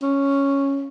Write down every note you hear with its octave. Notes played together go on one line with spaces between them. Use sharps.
C#4